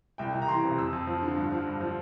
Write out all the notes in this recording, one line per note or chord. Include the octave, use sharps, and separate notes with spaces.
C2 G5
C2
A#5
E3 C6
C3
F2 E6
F2
F3
D3
G2
F3
G2
F3